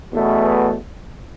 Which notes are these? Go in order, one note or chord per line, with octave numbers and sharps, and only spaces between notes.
E2 B2 A3